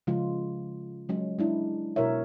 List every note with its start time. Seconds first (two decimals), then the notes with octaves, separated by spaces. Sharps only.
0.07 C#3 F3 G#3 F4
1.09 F#3 G#3 C#4
1.39 G#3 D4 E4
1.96 B2 E4 A#4 C#5 E5